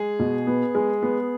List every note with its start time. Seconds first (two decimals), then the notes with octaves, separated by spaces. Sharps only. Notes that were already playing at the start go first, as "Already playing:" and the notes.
Already playing: G#3 G#4
0.20 B2
0.47 B3
0.75 G#3
1.03 B3